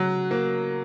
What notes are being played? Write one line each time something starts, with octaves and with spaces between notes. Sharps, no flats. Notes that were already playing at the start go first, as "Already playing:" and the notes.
Already playing: C#3 F#3 G#3 B3 F#4
A#3